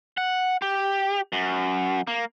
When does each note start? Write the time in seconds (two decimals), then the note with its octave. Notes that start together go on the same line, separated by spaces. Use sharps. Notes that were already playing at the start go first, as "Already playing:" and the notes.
0.17 F#5
0.62 G4
1.33 F#2
2.07 A#3